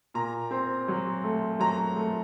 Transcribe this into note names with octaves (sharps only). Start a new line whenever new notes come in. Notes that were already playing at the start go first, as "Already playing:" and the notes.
A#2 A#5
C4
F#3
A3
F#3 A#5
A3